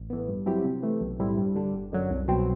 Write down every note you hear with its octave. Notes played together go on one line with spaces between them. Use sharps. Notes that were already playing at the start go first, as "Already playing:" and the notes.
Already playing: A1
A2 E3 B3
G2
F#3 C4 E4 G4
C3
E3 A3
B1
A2 G3 C4 E4
G2
D3 G3 D4
G1
F#2 D3 F#3
C2
B2 F#3 C4